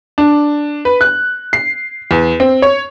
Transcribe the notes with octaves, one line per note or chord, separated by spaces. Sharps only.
D4
B4
F#6
C7
E2
C4
C#5